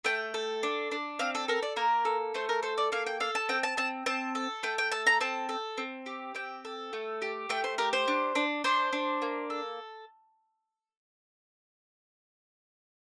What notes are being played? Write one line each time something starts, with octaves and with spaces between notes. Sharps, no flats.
A3 G5
A4
D4
D4
C4 F5
A4
A4 A#4
D5
A#3 A#4
A4
A3 C5
A#4
A4 C5
D5
A#3 F5
G5
A4 F5
A5
C4 G5
A5
C4 A5
C4 A5
A4
A3 G5
G5
A4 A5
A#5
C4 A5
A4
C4
G4
C4 G5
A4
A3
G4
A3 G5
C5
G4 A#4
C5
D4
D4
D4 C5
D4
A#3
A4